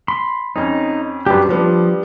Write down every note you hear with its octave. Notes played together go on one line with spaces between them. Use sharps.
B5 C6
F2 C#4 D#4
F#2 G3 D4 G4 B4
F3 G3 B3 D4